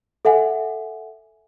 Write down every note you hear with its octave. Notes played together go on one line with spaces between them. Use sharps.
A4 E5 F#5 G#5